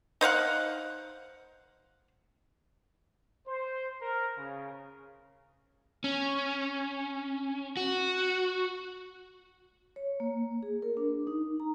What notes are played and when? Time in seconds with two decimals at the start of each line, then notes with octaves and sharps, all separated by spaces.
0.21 D#4 C5 F5 F#5
3.48 C5
4.02 A#4
4.38 C#3
6.04 C#4
7.77 F#4
9.96 C#5
10.20 A#3
10.63 G#4
10.82 A#4
10.97 D4
11.27 D#4
11.60 A#5